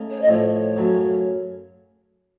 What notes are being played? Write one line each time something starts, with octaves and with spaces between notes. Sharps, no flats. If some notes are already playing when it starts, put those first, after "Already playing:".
Already playing: C#3 A3 D#4
C#5
D#5
A2 F3 A3 C#5
F#2 C#3 F#3 A3